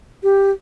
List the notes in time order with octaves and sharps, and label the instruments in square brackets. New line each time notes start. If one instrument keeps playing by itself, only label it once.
[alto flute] G4